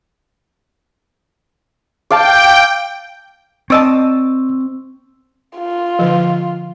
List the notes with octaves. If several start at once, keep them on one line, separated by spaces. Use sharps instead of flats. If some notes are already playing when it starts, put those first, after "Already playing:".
D5 F5 G5 A5
C4 D5 D#5 A5 C#6 E6
F4
D3 F3